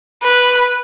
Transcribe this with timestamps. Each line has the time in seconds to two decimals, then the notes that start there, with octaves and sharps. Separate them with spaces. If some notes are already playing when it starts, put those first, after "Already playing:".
0.23 B4